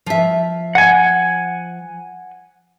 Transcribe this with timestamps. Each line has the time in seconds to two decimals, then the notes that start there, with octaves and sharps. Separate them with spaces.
0.06 F3 E5
0.75 F#5 G#5